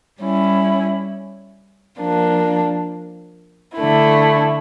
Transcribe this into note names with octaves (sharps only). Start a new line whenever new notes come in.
G3 C#4 E4
F3 A#3 D4
D3 A3 E4